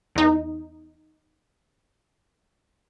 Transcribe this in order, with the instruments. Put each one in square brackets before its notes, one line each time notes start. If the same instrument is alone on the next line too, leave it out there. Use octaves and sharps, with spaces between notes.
[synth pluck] E2 D#4